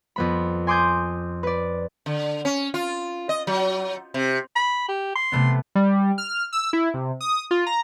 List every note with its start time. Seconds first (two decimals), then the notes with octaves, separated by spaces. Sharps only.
0.16 F2 B3 B5
0.67 G#5 C6 D6 D#6 G6 G#6
1.43 B4 D5
2.06 D3
2.45 C#4
2.74 F4
3.29 D#5
3.47 F#3
4.14 C3
4.56 B5
4.88 G4
5.16 C6
5.32 C3 A3 B3
5.75 G3
6.18 F6
6.52 E6
6.73 E4
6.94 C3
7.21 D#6
7.51 F4
7.66 A#5